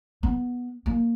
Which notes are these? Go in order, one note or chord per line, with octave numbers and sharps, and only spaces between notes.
B3
A#3